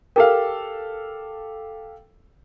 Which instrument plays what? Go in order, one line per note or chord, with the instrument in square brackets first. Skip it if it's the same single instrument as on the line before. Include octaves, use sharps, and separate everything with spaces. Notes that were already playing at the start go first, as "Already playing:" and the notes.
[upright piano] G4 A4 F5 [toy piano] A#4